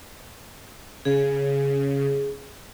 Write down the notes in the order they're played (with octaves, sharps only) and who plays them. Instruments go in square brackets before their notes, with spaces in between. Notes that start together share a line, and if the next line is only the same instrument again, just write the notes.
[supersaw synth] C#3 [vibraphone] G#4